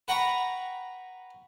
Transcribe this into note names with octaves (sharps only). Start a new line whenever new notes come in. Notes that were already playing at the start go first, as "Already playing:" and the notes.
B4 F#5 G5 A#5 B5 C#6